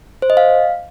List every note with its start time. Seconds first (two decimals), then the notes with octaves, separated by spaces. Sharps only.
0.22 C5
0.30 D#5
0.37 F5